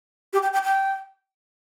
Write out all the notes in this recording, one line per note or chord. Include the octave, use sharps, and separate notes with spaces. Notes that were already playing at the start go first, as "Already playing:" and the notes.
G4
G5
G5
G5